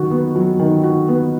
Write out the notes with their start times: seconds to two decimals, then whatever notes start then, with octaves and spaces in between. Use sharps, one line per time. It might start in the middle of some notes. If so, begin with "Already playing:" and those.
Already playing: D#3 F#3 F#4
0.11 B3
0.35 F#3
0.59 D#3
0.83 F#4
1.08 B3